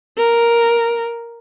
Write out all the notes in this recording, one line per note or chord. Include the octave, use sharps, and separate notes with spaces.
A#4